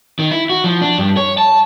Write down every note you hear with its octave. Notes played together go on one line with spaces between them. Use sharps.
D#3
E4
F#4
F3
D4
G2
C#5
A5